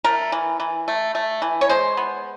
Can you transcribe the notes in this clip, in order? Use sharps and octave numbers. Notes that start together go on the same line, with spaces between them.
A3 A#4
E3
E3
A3
A3
E3
C#5
G#3 C5
B3